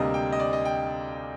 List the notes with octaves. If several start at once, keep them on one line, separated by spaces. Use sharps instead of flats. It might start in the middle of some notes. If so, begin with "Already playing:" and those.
Already playing: D2 C3 G3 A#3 D4 D#5
G5
D#5
D5
D#5
G5